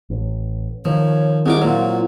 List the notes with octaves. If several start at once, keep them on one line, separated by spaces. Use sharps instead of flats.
A1
D#3 F3 C#5
G3 G#3 C4 C#4 E4 D6
A#2 F#3 F4